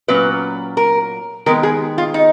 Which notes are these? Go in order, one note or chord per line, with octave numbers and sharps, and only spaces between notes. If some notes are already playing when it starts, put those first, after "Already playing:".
A#2 F#3 C#4 B4
A#4
D#3 G#3 B3 A#4
G#4
F4
D#4